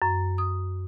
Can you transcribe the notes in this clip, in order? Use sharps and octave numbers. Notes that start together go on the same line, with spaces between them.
F#2
D#6